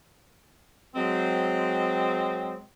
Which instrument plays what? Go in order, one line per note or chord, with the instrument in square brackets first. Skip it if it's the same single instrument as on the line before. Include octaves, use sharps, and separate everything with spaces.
[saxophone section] F#3 G#3 C4